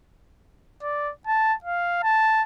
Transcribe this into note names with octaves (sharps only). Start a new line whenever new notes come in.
D5
A5
F5
A5